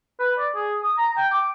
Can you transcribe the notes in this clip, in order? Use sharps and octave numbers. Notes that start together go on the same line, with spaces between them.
B4
D5
G#4
D#6
A#5
G5
D6